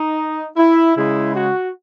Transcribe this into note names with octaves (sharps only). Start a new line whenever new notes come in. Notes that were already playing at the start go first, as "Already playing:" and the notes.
Already playing: D#4
E4
C#3 G#3 E4
F#4